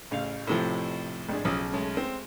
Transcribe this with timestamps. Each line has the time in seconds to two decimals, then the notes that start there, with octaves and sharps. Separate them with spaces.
0.11 A1 C#3 F5
0.47 A2 C3 F3
1.29 G#1 D4 G#4
1.45 B1 C#3 F3 D#6 E6
1.72 G#3 A3 C#4
1.97 C4